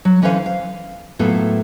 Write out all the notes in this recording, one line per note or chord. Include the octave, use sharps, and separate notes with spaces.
F#3
D3 E3 C#4 B4 C5 F5
F5
A2 F#3 A#3 B3 F4 A4